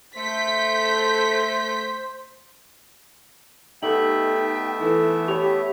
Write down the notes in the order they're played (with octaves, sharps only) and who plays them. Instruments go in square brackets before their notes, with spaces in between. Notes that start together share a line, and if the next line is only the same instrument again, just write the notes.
[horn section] A3 [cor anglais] C5 [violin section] G6 B6
[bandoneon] A3 B3 E5 [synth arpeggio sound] D#4 [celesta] G4 A4 F#7 [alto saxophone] G5
[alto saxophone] E3 [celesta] A4
[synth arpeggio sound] G4 C#5 [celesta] B5 F7